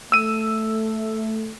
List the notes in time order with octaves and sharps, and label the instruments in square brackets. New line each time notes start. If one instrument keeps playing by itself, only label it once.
[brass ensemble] A3 [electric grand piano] E6 D#7